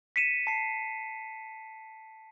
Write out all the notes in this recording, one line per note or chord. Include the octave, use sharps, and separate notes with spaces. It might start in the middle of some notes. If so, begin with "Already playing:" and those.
B6 C#7 D#7 E7
A5 C7